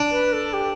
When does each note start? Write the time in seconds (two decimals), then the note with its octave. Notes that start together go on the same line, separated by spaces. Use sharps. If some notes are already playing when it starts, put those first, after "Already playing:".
Already playing: D4
0.11 B4
0.33 A4
0.53 G4